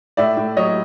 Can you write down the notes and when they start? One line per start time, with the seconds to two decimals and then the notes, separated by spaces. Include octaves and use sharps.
0.17 A2 D5 E5
0.37 A2
0.57 F#3 C#5 D#5